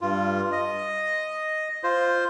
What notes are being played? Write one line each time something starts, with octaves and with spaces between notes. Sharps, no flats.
G2 F4
D#5
F4 C5